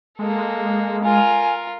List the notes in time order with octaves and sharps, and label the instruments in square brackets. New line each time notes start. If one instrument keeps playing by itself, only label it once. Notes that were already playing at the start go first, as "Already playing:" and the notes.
[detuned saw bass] G#3 [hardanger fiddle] A#3 A4
[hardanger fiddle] F4 A#4 [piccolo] G#5